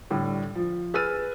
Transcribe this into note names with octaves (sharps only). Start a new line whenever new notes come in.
A2 D3 G3
F3
G#4 B4 E6 F6 A6 D#7